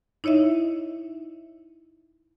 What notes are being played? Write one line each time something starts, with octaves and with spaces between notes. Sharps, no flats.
D#4 E4 C#5 D#5 E5